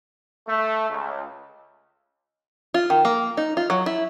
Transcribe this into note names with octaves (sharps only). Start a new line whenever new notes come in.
A3
C#2
F4
D#3
A#3
D#4
F4
F#3
E4